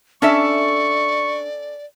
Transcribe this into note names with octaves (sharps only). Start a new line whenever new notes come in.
C#4 D4 A4 D5 E5 C#6